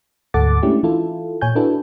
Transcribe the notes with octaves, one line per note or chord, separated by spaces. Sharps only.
D2 G#2 A4 F#5 D6 A6
G#3 A3 C#4 D4 E4 G4
E3 E4 F4 A4
A#2 C#5 G#5 G6
D4 E4 F#4 A4 B4